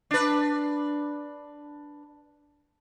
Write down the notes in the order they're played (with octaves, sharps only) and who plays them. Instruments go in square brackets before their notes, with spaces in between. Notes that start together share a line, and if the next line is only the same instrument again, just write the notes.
[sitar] D4 B4